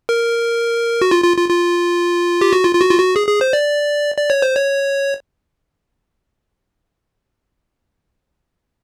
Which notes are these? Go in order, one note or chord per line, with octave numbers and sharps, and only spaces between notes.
A#4
F#4
F4
F4
F4
F4
G4
F#4
F4
F4
F#4
F4
F#4
G#4
G#4
C5
D5
D5
C#5
C5
C#5